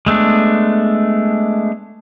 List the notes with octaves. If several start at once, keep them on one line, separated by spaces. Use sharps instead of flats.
G#3 A3 B3 D4